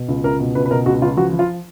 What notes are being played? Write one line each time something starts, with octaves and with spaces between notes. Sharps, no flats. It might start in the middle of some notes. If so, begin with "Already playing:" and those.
Already playing: B2
C#2
C#2 A#4
B2
C#2 B4
B4
B2 A#4
C#2 F#4
C#2 F4
F3 F#4
F3
F4